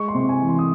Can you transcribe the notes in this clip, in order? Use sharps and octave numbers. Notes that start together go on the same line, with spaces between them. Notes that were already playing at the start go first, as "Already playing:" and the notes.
Already playing: G#3 C#6
C6
C3
G#5
E3
C6
D#6